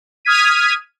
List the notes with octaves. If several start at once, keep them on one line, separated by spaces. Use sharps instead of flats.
D#6 F6 G#6 B6 D#7